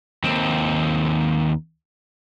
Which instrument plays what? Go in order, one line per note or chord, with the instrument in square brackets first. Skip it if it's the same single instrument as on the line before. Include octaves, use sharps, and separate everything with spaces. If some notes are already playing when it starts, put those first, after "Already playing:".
[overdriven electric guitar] D#2 C4